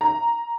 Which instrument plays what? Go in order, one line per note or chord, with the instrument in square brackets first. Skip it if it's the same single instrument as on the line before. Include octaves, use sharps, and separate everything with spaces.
[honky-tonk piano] A#5